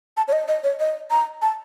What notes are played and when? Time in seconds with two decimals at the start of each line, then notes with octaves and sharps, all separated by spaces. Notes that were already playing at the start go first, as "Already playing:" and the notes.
0.17 A5
0.28 C#5
0.32 D#5
0.48 D#5
0.64 C#5
0.80 D#5
1.11 A#5
1.42 A5